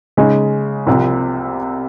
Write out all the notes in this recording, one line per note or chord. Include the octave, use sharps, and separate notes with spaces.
C#3 G#3 D#4 G#4
C2 C3 F3